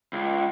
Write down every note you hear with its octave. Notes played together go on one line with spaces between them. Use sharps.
C#2